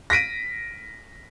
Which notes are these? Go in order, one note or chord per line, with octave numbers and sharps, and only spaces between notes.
A#6 B6 D7 D#7